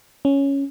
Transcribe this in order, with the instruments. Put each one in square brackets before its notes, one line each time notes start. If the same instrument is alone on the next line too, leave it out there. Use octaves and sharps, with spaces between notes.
[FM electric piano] C#4